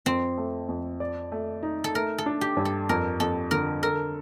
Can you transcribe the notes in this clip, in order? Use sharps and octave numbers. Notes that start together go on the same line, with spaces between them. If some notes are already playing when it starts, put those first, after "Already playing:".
F2 C4
A3
F2
D5
A3
D#4
A4
A3 A#4
A4
D4
G4
G2
A4
F2 A#4
F2 A4
D3 A#4
A4 A#4